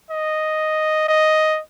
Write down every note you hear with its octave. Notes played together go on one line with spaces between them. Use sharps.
D#5
D#5